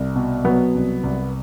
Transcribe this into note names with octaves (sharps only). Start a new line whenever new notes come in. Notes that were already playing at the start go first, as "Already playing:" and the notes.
Already playing: C2
B2
F#3 B3
C2
C2